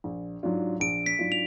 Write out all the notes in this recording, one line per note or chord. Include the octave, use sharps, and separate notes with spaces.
A#1
G#2 F#3 D4 F4
A#1 D7
B6
G#2 F#3 D4 F4
F7